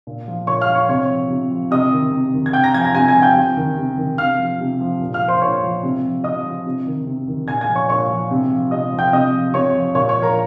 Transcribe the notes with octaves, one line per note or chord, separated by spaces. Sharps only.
A#2
F3
A#2 C#5 C#6
F5 F6
F3
C#5 C#6
C3 C#5 C#6
F3
C3
F3
C3 D#5 D#6
D#3
C3
D#3
G#6
C3 G5 G6
A#5 A#6
F3 G#5 G#6
A#5 A#6
C3 G#5 G#6
G#5 G#6
F3
G5 G6
C3
D#3
C3
D#3
C3 F5 F6
F3
C3
F3
A#2
F5 F6
F3
C5 C6
A#2 C#5 C#6
F3
C3
F3
C3 D#5 D#6
F3
C3
D#3
C3
D#3
A#2 G#5 G#6
G#5 G#6
F3
C#5 C#6
A#2 C#5 C#6
F3
C3
F3
C3 D#5 D#6
F3
G5 G6
C3 D#5 D#6
F3
C3 C#5 C#6
F3
A#2 C#5 C#6
C#5 C#6
F3
A#4 A#5